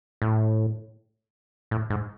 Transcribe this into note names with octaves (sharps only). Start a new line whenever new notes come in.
A2
A2
G#2